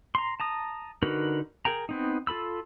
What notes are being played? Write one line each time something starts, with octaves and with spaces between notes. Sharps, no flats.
A#5 C6
A5 A#5 D#6
D3 D#4 F#4 A#4 B4
G#4 A#4 G5 A#5
B3 C4 D#4
F4 A4 B5 E6